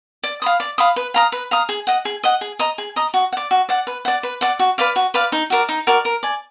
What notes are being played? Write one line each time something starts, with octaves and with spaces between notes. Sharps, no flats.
D5
F5 B5 D#6
D5
F5 B5 D#6
B4
F5 A#5 D#6
B4
F5 A#5 D#6
G#4
D#5 F#5
G#4
D#5 F#5
G#4
D#5 A#5 D#6
G#4
D#5 A#5 D#6
F#4
F#5
D5
F#4
D5 F#5
B4
D5 F#5
B4
D5 F#5
F#4
B4 D5 F5
F#4
B4 D5 F5
D#4
F#4 A#4 D5
D#4
F#4 A#4 D5
A#4
D5 G#5